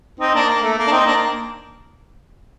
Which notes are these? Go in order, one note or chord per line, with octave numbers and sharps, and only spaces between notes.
C4 D#4
A#3 D4
A#3
A3
A#3
D4
C4 D#4
A#3 D4
A#3